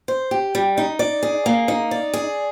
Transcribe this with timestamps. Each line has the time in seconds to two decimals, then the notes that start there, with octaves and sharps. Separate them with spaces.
0.08 C5
0.31 G4
0.55 G3
0.78 D#4
0.99 D5
1.23 G#4
1.46 A#3
1.68 D#4
1.91 D5
2.14 G#4